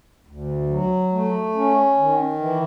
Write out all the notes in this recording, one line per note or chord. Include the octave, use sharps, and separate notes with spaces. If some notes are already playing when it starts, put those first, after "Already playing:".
D2
F#3
A3
C#4
D#3
E3